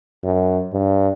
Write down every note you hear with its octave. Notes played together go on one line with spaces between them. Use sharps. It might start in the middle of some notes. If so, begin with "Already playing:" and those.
F#2
G2